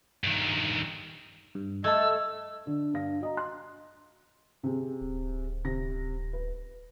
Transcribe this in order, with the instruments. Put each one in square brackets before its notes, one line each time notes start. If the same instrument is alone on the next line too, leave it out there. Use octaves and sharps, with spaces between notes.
[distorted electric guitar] G2 D#3
[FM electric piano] G2
[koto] A3 [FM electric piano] A4 G#6 [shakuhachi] D#5 [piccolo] E6
[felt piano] D3 [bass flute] D4
[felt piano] G2 F5 A#6
F#4 D#5 A#5
C6 F#6
C3 C4 G#4
[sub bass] D1
[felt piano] C3 A#6
B4